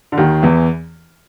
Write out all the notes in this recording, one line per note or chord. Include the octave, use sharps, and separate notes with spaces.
D3
D#2 D#3
E2 E3